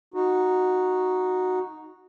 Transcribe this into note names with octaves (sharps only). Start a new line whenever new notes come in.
D#4 F#4